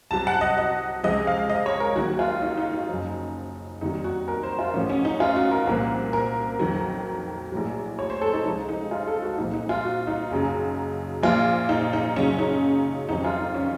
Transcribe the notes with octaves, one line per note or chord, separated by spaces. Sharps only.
C2 C3 F#3 A5
F#5
D#5
D#5
C#2 C3 F3 D#5
F5
D#5
C#5
A#4
D#2 D#3 F#3 F#4
F4
D#4
D#4
D#4
F#1 F#2 F3
F1 D#2 D#3 F#3 D#4
F#4
A#4
C5
F4
A1 A2 F3 C#4
C#4
D#4
F4
F#4
A#4
C2 A#2 F3 A#4
A#4
F2 D#3 F#3
A#1 A2 F#3
C#5
C5
A4
D#4
C#2 C3 F3 D#4
D#4
F4
A4
F#4
C2 A#2 F3 D#4
D#4
F4
F#4
D#4
F#1 F#2 C#3 F#3
A#1 A#2 F3 F4
D#4
D#4
F#1 F#2 C#3 F#3 C#4
D#4
F1 F2 D#3 F#3 D#4
F4
D#4
C#4